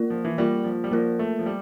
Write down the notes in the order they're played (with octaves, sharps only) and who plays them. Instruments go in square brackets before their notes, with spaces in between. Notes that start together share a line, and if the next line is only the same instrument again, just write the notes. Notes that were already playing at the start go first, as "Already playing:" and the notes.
Already playing: [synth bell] A#3 F4 A#4 D5
[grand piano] F3
E3
[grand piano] G3 [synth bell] A#3 F4 A#4 D5
[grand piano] F3
G3
[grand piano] F3 [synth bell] A#3 F4 A#4 D5
[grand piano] A3
F3
G3